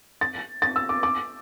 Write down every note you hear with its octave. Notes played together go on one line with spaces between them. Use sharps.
A6
A6
E6
D6
D6